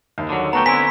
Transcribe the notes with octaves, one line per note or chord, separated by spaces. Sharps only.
D#2
D3 F#3
A3 B3 F#4 G5 A#5
D3 C4 E4 G#5 B5 C6 B6